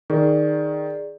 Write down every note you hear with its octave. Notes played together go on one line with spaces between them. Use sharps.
D#3 G#4 D5